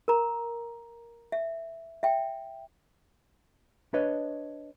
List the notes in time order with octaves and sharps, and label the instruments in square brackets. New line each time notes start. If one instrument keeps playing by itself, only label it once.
[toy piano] A#4 A#5
E5
E5 G5
[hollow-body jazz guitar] D4 B4 C#5 D#5